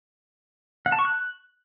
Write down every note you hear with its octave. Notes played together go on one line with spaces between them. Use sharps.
F#5
A5
C#6
F#6